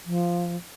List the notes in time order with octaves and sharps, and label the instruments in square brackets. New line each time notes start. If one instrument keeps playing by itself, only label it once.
[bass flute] F3